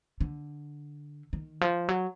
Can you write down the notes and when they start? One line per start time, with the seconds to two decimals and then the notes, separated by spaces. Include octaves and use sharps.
0.21 D3
1.33 D#3
1.61 F3
1.89 F#3